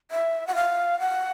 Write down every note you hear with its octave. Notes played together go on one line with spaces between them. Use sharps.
E5
F#5
F5
F#5